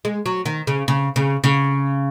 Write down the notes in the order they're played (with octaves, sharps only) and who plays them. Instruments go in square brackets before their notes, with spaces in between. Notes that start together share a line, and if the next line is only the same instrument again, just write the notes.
[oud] G#3
F#3
D#3
C#3
C#3
C#3
C#3